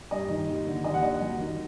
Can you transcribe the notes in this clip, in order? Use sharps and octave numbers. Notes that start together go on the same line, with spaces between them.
G2 D#5
D#3
D#2
D3
D#2 D#5
F#5
D3 D#5
F#2
D#3